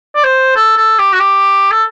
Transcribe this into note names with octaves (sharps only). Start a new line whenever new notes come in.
D5
C5
A4
A4
G4
F#4
G4
A4